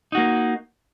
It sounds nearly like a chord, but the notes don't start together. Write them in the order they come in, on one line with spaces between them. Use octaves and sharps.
D#4 F#4 A#3